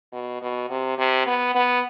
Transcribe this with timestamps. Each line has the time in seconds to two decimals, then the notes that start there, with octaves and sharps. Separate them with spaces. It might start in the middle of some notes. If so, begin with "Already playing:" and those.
0.12 B2
0.42 B2
0.70 C3
0.98 C3
1.27 B3
1.55 B3